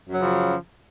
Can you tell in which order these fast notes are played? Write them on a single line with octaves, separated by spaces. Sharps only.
F#2 F#3 C#3 F3